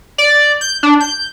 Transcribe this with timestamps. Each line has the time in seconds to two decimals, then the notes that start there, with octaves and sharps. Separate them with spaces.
0.18 D5
0.61 G6
0.83 D4
1.01 G6